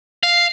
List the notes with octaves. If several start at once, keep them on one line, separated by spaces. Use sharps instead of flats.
F5